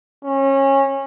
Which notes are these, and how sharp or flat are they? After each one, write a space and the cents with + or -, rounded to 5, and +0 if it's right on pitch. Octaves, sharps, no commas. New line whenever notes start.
C#4 -25